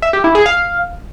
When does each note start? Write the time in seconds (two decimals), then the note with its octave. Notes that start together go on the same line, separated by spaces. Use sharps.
0.02 E5
0.13 G4
0.24 E4
0.35 G#4
0.46 F5